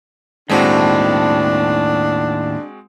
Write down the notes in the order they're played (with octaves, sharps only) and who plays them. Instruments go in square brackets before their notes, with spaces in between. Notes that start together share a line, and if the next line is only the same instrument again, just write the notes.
[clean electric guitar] D#2 A2 [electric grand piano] G#3 C4 F#4 [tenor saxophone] D4